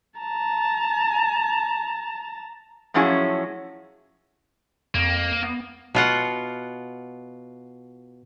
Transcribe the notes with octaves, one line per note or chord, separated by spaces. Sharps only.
A5 A#5
A2 F3 F#3 C#4 E4 G#4
F2 A#3
B3
B2 F4 F#5